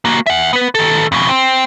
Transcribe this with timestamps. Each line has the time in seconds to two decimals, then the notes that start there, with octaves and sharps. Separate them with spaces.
0.05 A#3 F#4
0.26 E5 F#5
0.53 B3 B4
0.75 D#3 A4
1.12 F2 B2
1.29 C4